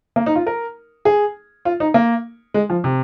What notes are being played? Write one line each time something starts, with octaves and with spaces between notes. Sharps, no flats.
A#3
D#4
F4
A#4
G#4
F4
D#4
A#3
G#3
F3
C3